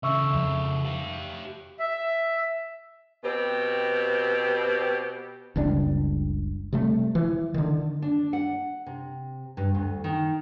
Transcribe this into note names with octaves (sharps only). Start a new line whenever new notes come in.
C#3 A4 E5 C#6 E6
F2
G4 F5
E5
B2 C4 G4
F#1 C#2 G3 D4
C3 G3 A3
E3
D3 D#3
D4
F#5
C3
G2
D2
D#3